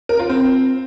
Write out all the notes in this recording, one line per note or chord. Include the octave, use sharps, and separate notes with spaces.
A#4
F4
C4